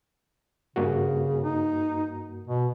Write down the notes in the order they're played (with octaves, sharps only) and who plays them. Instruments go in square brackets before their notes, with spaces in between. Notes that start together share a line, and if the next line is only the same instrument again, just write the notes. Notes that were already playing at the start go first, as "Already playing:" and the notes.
[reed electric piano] G2 A#3 F#4 [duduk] C#3
[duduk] D#4
B2